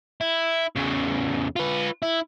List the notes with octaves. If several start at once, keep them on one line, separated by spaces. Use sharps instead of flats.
E4
E2 C#3
F4 B4
E4